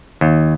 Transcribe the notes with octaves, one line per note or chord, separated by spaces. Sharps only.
D#2